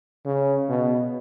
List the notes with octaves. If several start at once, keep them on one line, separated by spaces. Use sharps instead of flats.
C#3
B2